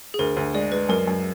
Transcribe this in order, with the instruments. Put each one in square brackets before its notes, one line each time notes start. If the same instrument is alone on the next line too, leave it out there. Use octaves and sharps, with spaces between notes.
[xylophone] G#4
[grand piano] D2 [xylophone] A#4
[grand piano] D2
[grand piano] G#3 [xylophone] D5
[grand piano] G#3 [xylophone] B4
[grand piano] F#2 [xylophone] A#4
[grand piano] F#2